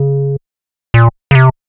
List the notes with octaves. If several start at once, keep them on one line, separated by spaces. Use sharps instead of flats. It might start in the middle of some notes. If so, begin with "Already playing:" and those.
Already playing: C#3
A#2
C#3
C3